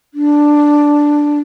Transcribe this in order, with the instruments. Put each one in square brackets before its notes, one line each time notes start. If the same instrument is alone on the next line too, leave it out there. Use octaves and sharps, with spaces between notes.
[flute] D4